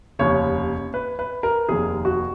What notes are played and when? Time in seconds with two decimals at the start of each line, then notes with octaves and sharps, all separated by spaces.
0.19 F1 D#2 C#3 C#5
0.94 B4
1.19 B4
1.43 A#4
1.69 F1 D#2 D#3 G#4
2.05 F#4